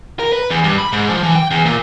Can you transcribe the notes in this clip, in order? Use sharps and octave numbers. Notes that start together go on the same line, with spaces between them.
A#4
B4
E2
G2
B5
G#2
F3
E3
G5
E2
A#2